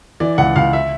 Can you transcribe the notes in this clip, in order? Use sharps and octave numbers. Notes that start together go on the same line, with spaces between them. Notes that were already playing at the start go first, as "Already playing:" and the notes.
E3 D5
C#2 F#5
C#2 F5
E5